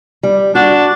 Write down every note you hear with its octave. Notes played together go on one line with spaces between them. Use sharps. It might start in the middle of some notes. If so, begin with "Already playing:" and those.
G3
D4 F#4